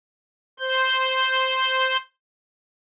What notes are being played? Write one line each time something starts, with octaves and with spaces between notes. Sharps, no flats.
C5 G6